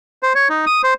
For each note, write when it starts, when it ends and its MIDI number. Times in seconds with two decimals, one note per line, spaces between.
0.23 0.33 72
0.35 0.48 73
0.49 0.65 63
0.66 0.82 87
0.84 0.94 72